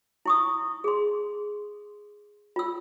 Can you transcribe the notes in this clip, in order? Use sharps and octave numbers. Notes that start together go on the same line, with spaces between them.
E4 C#6 D#6
G#4 C6
F4 E6